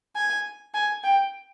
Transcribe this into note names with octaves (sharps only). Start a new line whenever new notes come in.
G#5
G#5
G5